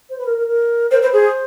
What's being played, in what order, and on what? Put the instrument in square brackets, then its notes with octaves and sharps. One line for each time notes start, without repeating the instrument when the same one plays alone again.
[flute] C5
B4
A#4
A#4
A#4
[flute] A#4 [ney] C5
[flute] B4 [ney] C5
[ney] G#4 [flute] C5